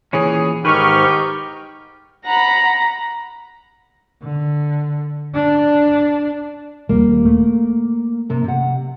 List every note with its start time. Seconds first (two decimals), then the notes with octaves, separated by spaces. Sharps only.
0.13 A#2 E3 C#4 G#4 C#5
0.65 G#2 D#3 D#4 G4 B4 C#6 F6
2.25 F#5 A#5 B5
4.22 D3
5.34 D4
6.89 D#1 G3 A#3
7.25 A3
8.30 C3 A#3
8.44 C3 F#5